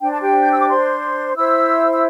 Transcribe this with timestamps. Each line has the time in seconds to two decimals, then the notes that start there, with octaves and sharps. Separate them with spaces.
0.01 D4 C5 G5
0.11 A5
0.21 G4 G5
0.43 G6
0.51 E6
0.60 D6
0.69 C5 C6
1.36 E4 C5 E5 E6
1.92 E6